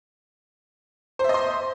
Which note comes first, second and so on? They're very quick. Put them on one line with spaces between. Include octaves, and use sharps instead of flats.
C5 E5 D#5 C6